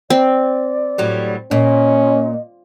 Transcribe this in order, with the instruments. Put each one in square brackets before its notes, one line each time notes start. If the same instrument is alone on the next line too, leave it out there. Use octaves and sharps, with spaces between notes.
[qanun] C4 [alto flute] D5
[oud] A2 F#3 G3
[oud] A#2 [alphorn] C#4 [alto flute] D#5